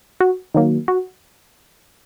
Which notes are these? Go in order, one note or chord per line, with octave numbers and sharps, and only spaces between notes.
F#4
D#3 F#3 A#3
F#4